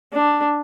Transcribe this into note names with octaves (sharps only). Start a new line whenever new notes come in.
D4